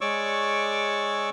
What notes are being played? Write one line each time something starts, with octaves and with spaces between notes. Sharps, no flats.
G#3 C#5 D5 C#6 D6 E6